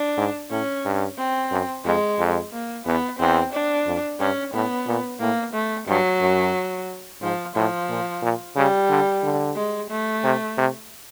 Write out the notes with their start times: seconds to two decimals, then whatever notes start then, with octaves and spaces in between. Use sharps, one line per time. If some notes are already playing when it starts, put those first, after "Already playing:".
Already playing: D4
0.18 G#2
0.51 A2 C#4
0.85 G2
1.18 C4
1.52 F#2
1.85 F2 G#3
2.19 F2
2.52 A#3
2.86 E2 B3
3.19 E2 C4
3.53 D4
3.87 F2
4.20 G2 C#4
4.53 A2 B3
4.87 A#2
5.20 A2 A#3
5.54 A3
5.88 G2 F#3
6.21 F#2
7.22 G#2 F3
7.56 A2 F3
7.89 A#2
8.23 A#2
8.56 C#3 G3
8.89 D3
9.23 D3
9.56 G#3
9.90 A3
10.24 C3
10.58 C3